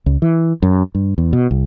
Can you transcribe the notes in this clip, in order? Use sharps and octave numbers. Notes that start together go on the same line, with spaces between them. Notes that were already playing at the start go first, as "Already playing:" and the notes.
C#2
E3
F#2
G2
E2
B2
C2